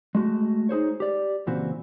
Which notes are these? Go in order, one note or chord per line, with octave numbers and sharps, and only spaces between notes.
G#3 A3 F#4
D#4 G#4 C5 C#5
G4 D5
C#2 A#2 E3 C4 F#4 C5